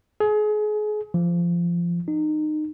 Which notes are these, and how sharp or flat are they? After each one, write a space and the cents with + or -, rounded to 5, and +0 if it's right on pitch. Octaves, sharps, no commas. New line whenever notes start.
G#4 +30
F3 -20
D#4 -25